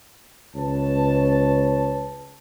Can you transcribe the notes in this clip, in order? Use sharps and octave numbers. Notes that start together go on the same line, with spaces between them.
C#2 B4 C#5 A5